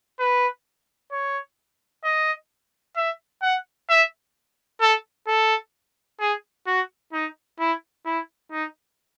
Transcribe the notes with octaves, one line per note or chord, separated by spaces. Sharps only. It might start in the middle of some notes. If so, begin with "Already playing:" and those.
B4
C#5
D#5
E5
F#5
E5
A4
A4
G#4
F#4
D#4
E4
E4
D#4